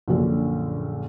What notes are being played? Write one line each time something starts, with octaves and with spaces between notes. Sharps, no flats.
A#1 F#2 A#2 D3